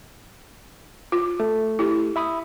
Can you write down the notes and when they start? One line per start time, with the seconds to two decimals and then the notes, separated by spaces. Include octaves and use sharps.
1.12 F4
1.40 A3
1.79 E4 G4
2.16 E5 B5 D#6